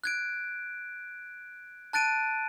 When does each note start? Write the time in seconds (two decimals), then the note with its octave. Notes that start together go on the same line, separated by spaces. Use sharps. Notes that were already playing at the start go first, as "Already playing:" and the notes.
0.04 F#6 G#6 D7
1.93 A5 F#6 A6 D7 D#7